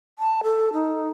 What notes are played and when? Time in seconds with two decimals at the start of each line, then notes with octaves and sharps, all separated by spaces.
0.19 A5
0.43 A4
0.73 D#4